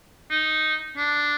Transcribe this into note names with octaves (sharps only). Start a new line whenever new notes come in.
D#4
D4